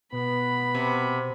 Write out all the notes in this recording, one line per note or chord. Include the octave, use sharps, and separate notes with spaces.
B2 B3 B5
C3